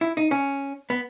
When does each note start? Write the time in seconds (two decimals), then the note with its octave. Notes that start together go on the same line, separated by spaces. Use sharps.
0.01 E4
0.17 D#4
0.31 C#4
0.90 B3